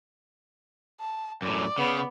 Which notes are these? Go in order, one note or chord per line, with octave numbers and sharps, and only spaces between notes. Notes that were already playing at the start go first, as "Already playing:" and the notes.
A5
F#2 A2 D5
C#3 B3